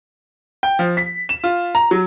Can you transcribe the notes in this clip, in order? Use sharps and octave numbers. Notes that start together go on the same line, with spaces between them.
G5
F3
B6
E7
F4
A#5
F#3